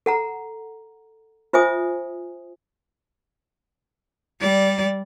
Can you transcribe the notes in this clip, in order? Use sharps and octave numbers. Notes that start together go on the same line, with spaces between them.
A4 F#5 A#5
F4 C5 E5 G#5 D#6
G3 D5